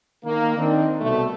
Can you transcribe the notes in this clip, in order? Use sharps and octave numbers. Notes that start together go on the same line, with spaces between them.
D#3 A#3
D#3 C4 D4 D#4
C2 B2 A3